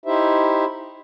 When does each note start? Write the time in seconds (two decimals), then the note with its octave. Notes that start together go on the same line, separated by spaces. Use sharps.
0.06 D#4 E4 G4 C5 E5